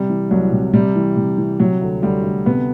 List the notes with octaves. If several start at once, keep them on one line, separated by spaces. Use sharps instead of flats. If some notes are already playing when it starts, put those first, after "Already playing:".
Already playing: C3 G3
E3
C2 F#3
C3
C3 G3
E3
C3
E3
C3 F#3
D2
D2 G3
D2
C3 B3